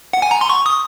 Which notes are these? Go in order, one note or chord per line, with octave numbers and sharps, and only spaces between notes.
F#5
G#5
A#5
C6
C#6
D#6